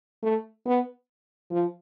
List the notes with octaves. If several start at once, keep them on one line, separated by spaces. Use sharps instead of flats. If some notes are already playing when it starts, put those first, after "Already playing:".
A3
B3
F3